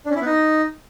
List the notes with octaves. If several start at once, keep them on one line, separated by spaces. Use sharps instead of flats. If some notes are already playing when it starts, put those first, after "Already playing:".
D4
C#4
E4
B3
D#4